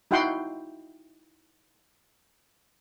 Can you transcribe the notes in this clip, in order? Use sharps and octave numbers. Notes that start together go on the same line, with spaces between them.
D#4 E4 F#4 F#5 G5 C6